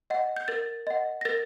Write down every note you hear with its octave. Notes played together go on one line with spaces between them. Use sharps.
D#5 F#5
G6
A#4 A6
D#5 F#5
A#6
A#4 A6